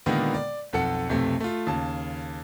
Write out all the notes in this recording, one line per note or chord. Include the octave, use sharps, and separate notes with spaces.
A#2 D3 D#3 G#3 A#3 B3
D5
B1 F2 A4 F#5 C#7
B1 F2 C3 A3
A3 F4
D#2 C#3 A5